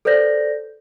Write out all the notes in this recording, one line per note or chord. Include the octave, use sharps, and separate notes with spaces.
A4 B4 C5 D5 G6 A#6